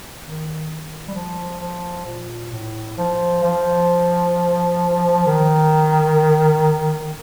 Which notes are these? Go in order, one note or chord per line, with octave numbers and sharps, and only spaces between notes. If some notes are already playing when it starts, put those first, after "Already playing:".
D#3
G3
F3
F3
A#2
A2
F3
F3
D#3